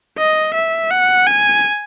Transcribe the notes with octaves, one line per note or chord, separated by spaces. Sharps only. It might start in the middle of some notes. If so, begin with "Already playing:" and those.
D#5
E5
F#5
G#5